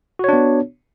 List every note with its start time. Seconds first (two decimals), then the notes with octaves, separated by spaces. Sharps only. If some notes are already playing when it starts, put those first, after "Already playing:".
0.19 F#4
0.24 C#5
0.28 D4
0.33 B3